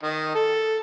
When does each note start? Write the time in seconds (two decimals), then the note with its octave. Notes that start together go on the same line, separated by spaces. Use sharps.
0.03 D#3
0.35 A4